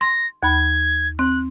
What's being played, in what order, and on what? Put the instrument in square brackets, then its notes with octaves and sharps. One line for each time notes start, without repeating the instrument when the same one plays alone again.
[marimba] C6 [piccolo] A#6
[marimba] D#2 B5 [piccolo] G#6
[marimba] C4 [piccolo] F#6